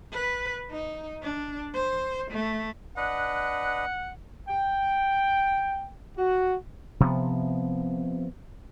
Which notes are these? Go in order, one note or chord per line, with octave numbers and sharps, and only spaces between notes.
B4
D#4
D4
C5
A3
D4 B4 D#5 F#5
G5
F#4
C3 F3 B3